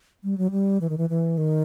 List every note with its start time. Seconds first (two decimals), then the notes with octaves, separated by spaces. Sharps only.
0.24 G3
0.38 F#3
0.51 G3
0.81 E3
0.89 D#3
0.98 E3
1.10 E3
1.38 D#3